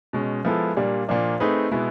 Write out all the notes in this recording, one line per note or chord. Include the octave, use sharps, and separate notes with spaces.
B2 G#3 C#4
F3 G#3 B3 E4 A4
A#2 G3 A#3 D4
A#2 F3 A#3 D4
A3 C4 D#4 G#4 B4
B2 G#3 B3 E4